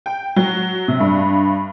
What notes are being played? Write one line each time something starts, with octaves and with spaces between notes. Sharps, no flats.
G5
F#3
C3
G2